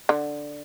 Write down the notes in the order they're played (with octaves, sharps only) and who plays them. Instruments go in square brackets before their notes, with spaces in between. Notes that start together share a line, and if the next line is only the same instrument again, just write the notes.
[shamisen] D3